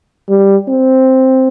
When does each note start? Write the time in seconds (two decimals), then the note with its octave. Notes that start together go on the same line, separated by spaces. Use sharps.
0.29 G3
0.69 C4